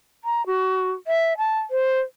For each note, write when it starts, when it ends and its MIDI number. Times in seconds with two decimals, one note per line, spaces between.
0.24 0.45 82
0.46 0.92 66
1.07 1.37 76
1.38 1.59 81
1.71 1.99 72